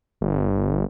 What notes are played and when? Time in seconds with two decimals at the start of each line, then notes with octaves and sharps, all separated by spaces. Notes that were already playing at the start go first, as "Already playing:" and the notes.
0.21 G1